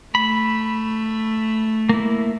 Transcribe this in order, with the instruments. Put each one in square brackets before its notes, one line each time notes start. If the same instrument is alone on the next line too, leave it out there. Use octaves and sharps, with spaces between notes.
[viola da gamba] A3 [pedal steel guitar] B5
[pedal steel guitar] A#3 E4